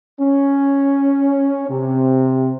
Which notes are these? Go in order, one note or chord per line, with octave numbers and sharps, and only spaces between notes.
C#4
C3